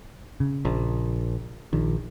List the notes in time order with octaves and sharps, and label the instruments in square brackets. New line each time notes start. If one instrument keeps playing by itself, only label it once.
[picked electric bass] C#3
[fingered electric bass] A#1
[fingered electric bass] A#1 [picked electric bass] D#3